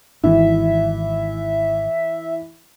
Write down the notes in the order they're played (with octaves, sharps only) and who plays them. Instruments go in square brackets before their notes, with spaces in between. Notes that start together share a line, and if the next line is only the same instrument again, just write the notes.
[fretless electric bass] G#1 [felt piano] E3 [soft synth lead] E5